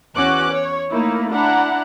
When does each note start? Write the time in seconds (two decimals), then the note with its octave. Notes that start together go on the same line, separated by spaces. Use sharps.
0.15 E2 C#4 F#4 D6 F#6
0.51 C#5
0.90 A3 A#3 D#4 E4
1.32 D4 E4 F#5 A#5